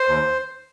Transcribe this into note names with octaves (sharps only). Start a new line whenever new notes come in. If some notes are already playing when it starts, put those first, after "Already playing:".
Already playing: C5
D#2